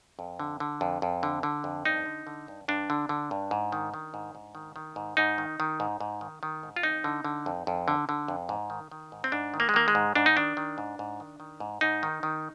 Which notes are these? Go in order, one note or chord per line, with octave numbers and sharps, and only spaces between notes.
F2
D3
D3
F2
F2
D3
D3
F2
G2 D#4
D3
D3
G2
G2 D4
D3
D3
G2
G#2
D#3
D#3
G#2
G#2
D#3
D#3
G#2
G#2 D#4
D#3
D#3
G#2
G#2
D#3
D#3
G#2
F4
F2 D#4
D3
D3
F2
F2
D3
D3
F2
G#2
D#3
D#3
G#2
C4
G#2 D4
D#3
A#3
G#3
D#3 A#3
G#3
G#2
G#2 D4
D#4
D#3 D4
D#3
G#2
G#2
D#3
D#3
G#2
G#2 D#4
D#3
D#3